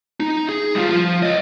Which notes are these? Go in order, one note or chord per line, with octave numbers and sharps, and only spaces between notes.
D#4
G#4
G3 F4
F3 F4
C#5 D#5